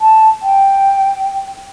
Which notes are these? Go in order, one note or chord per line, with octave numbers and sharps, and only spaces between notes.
A5
G5